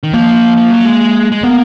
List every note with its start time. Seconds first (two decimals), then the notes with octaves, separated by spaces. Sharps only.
0.03 D#3
0.13 F3 A#3
0.57 F3
0.71 F#3
0.85 G#3
1.32 G#3
1.43 A#3 B3